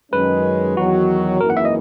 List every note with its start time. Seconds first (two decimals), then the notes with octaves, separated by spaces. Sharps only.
0.12 F#2 D#3 G#3 C#4 B4
0.77 E2 D#3 F#3 F#4
1.41 G#1 F#2 E3 A#3 A#4
1.50 F#5
1.57 E5
1.65 D#5